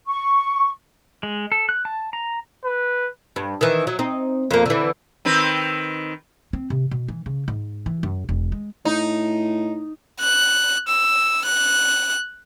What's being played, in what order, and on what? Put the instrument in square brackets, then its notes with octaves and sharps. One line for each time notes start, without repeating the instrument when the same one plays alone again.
[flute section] C#6
[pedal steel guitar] G#3
A4
F#6
A5
A#5
[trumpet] B4
[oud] G2
D#3 E3
F#3
C4 D#4
F2 A#3
D3 E3
[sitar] D#3 C4 B4
[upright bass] C4
C3
B2
E3
C#3
G#2
E3
F#2
E1
G#3
[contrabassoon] A2 [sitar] D#4
[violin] F#6
E6
F#6